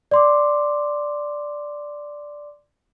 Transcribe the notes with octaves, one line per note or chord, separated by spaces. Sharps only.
D5 C6 D6